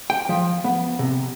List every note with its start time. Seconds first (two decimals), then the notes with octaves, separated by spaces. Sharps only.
0.10 G5
0.29 F3
0.64 B3
0.99 C3